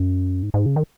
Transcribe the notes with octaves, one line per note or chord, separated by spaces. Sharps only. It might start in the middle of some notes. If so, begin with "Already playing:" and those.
Already playing: F#2
G#2
G#2
C#3
D#3